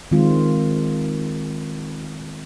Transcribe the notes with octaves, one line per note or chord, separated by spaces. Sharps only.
D#3 G#3 C4 F4